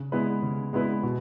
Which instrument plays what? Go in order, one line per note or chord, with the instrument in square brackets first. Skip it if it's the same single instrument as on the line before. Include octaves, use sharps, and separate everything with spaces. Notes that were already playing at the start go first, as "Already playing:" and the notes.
Already playing: [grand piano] C#3
G#3 B3 E4 B4
C#3
G#3 B3 E4 B4
B2